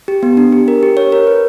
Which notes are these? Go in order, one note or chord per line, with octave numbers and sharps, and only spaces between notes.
G4
B3
D4
G4
A#4
G4
C#5
A#4
B4